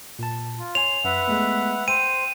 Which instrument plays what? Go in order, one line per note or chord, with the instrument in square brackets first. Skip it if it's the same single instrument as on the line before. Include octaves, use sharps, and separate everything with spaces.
[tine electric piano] A#2 A5
[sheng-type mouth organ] F4
[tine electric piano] C#5 G#5 [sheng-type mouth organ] C6 [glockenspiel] F7
[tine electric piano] F#2 [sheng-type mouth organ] B4 E5 F#5
[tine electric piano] G#3 A3 B3
[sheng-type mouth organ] C5 [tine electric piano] G5 [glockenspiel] D#7